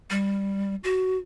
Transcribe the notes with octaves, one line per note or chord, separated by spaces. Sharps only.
G3
F#4